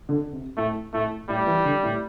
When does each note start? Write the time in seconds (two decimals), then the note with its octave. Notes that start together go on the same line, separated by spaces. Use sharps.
0.09 D3
0.33 C3
0.57 A2 A3
0.93 A2 A3
1.29 A2 G3
1.46 E3
1.65 D3
1.83 A2